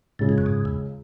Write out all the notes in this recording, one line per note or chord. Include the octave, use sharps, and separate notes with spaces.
C#2 A2 C#3 G#3
G#2
F#2
G#2
E2